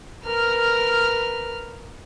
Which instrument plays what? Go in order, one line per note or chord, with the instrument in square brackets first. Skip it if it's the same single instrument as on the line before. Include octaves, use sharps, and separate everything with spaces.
[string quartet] A#4 B4 F6